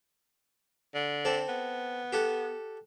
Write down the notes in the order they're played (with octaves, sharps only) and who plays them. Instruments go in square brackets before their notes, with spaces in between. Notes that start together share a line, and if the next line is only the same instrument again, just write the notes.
[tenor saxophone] D3
[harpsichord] C4 A4 D5
[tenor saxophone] B3
[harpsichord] G4 A4 F#5